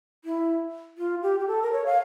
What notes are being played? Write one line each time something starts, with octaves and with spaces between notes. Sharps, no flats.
E4
F4
G4
G4
A4
A#4
C#5
F5